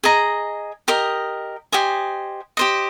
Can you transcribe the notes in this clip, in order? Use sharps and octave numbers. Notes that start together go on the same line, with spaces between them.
G#4 D#5 A#5
G4 A#4 D#5
G4 C5 D#5 G#5
G4 C5 D#5